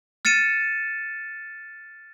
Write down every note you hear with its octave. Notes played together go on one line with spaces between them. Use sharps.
F6 A6 C#7 D#7 E7